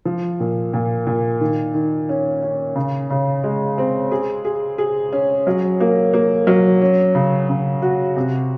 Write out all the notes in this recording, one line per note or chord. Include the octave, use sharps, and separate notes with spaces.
F3
A#2
A#2
A#2
D#3
D#3
C#4
C#4
C#3
C#3
G#3
C4
G#4
G#4
G#4
C#4
F#3
A#3
A#3
F#3
C#4
C#3
C#3
F#4
C3